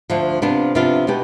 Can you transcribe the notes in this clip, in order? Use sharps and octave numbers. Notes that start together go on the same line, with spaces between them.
D2 D3 F3
C3 F3 B3 D4 F4
C3 F3 B3 D4 F4
B2 B3 D#4 G4